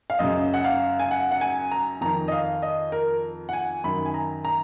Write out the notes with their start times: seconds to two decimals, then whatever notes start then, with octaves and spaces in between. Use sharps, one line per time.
0.10 F5
0.19 F#2 C#3 D#5
0.54 F#5
0.64 F5
1.00 G#5
1.11 F#5
1.31 F#5
1.41 G#5
1.71 A#5
2.01 F2 D#3 A#5
2.28 D#5
2.32 F5
2.62 D#5
2.92 A#4
3.49 F#5
3.53 G#5
3.84 F#2 D#3 B5
4.05 G#5
4.14 A#5
4.45 A#5